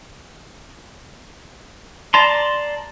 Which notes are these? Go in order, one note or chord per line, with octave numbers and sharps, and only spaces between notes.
D5 A5 A#5 C6